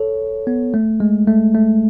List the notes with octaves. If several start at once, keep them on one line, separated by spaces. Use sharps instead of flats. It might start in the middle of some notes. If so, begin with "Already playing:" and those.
Already playing: A4 C#5
B3
A3
G#3
A3
A3